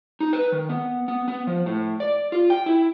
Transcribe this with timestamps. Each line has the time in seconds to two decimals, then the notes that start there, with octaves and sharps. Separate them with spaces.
0.20 D#4
0.33 B4
0.52 D#3
0.69 B3
1.08 B3
1.28 B3
1.47 F3
1.66 A2
2.00 D5
2.32 F4
2.50 G5
2.66 E4